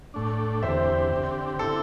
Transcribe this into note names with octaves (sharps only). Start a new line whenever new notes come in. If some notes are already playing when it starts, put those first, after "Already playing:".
A2 A3 D4
E2 D3 C4 G4 C5 E5
D3 C4 G4
D3 C4 E4 A4